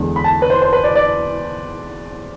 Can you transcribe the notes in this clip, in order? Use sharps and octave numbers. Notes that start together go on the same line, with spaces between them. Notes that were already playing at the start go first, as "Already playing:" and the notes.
Already playing: E2 D3 G#3
B5
A5
B4
C5
C5
B4
D5
D5